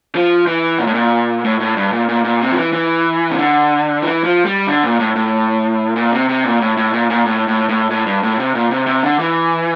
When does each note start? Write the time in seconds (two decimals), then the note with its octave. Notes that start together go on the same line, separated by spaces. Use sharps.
0.15 F3
0.47 E3
0.79 A#2
0.87 A2
0.95 A#2
1.44 A2
1.60 A2
1.77 G2
1.93 A#2
2.08 A#2
2.24 A#2
2.40 C3
2.52 F3
2.56 E3
2.73 E3
3.31 C3
3.38 D3
4.02 E3
4.24 F3
4.46 G3
4.67 D3
4.84 A#2
5.00 A2
5.15 A2
5.96 A#2
6.12 C3
6.29 C3
6.44 A#2
6.61 A2
6.77 A2
6.93 A#2
7.10 A#2
7.25 A2
7.48 A2
7.69 A2
7.90 A2
8.06 G2
8.23 A2
8.39 C3
8.55 A#2
8.71 C3
8.87 C3
9.03 D3
9.19 E3